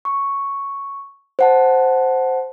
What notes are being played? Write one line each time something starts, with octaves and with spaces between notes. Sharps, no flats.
C#6
C5 F#5 A5